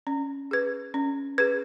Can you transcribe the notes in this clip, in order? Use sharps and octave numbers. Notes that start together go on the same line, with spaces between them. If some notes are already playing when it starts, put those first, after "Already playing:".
C#4
G#4 B4
C#4
G#4 B4